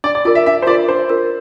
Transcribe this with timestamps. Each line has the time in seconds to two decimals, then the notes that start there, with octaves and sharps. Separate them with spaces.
0.04 D4 D5
0.15 D5
0.25 F4 A#4 D5
0.35 E5
0.46 D4 E5
0.62 C5
0.67 F4 A#4 D5
0.88 D4 C5
1.09 F4 A#4